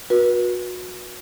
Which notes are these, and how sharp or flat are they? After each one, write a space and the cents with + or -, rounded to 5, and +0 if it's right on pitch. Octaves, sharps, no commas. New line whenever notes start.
F#4 -30 B4 -35